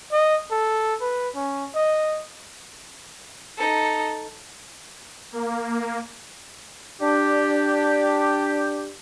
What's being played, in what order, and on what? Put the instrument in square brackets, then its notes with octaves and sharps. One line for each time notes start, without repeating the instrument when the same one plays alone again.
[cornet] D#5
A4
B4
C#4
D#5
[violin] D#4 A4
[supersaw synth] A#3
[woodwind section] D4 G4